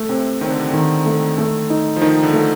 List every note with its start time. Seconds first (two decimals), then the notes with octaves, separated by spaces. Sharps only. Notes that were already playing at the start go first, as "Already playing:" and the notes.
Already playing: A3
0.09 C3 C4
0.41 D#3 C4
0.50 D3
0.59 C3
0.69 D3 D#3
1.06 A3
1.38 A3
1.70 D#4
1.96 F3
2.01 D#3 D#4
2.23 D3
2.33 A3